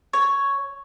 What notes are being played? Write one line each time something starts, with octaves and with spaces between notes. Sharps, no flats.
C#5